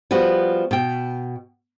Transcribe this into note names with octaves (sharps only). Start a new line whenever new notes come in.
F3 G3 B3 F#4
B2 G5